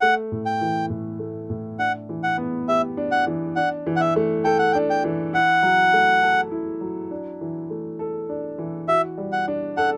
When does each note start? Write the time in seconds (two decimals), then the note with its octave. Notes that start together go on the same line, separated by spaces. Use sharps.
0.01 A3 F#5
0.32 A2
0.46 G5
0.61 E3
0.90 A2
1.19 A3
1.50 A2
1.79 D4 F#5
2.09 E3
2.23 F#5
2.38 B3
2.68 G4 E5
2.97 D4
3.12 F#5
3.27 E3
3.56 D4 F#5
3.87 E3
3.96 F#5
4.01 E5
4.16 A3
4.44 A4 G5
4.59 F#5
4.72 G5
4.75 D4
4.90 G5
5.04 E3
5.33 E4 F#5
5.63 F#3
5.93 A3
6.23 A4
6.51 E4
6.81 F#3
7.11 D4
7.41 E3
7.70 A3
7.99 A4
8.29 D4
8.58 E3
8.88 F#4 E5
9.18 G3
9.32 F#5
9.48 D4
9.77 A4 F#5